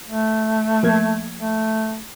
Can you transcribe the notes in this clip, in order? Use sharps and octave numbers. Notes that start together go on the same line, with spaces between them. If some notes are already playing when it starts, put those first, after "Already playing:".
A3
F3 A#3 G#6
A3